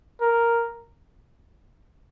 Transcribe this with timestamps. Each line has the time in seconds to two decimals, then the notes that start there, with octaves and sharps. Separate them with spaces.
0.22 A#4